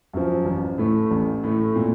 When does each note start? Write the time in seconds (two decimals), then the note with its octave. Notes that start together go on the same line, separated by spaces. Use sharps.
0.13 F#2 F3
0.45 A1
0.78 A2 A3
1.11 A1
1.44 A2 A3
1.75 A#2